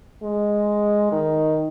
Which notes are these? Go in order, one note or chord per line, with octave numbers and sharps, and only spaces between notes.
G#3
D#3